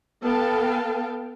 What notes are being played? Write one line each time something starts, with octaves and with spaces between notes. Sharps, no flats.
B3 A4 F5 G5 A5